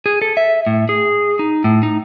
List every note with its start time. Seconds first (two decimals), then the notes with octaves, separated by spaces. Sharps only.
0.06 G#4
0.22 A4
0.37 E5
0.67 A2
0.89 G#4
1.39 D#4
1.64 A2
1.83 D#4